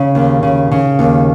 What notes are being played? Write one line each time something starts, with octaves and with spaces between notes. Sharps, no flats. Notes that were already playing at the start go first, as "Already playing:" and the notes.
Already playing: C#3
D#2
C#3
C#3
D#2